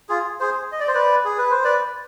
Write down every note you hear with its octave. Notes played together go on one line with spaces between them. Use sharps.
F4 G#4
G#4 C5
D#5
D5
C5
B4 D5
G#4
B4
C5
B4 D5